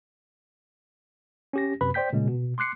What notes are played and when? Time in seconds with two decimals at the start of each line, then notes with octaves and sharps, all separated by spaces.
1.53 C#4 G4 A#6
1.81 F#2 C3 B4 B5
1.94 C5 D5 G5 G6 B6
2.13 A#2 C#3 G#3
2.28 B2
2.58 C6 D6 F#6 C7 C#7